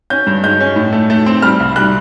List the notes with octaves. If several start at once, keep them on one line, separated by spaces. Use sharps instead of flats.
C#4 G6
G2
G#3 G6
C#4
A2
A3
A3
C4
G3 F6
C2
G3 F#6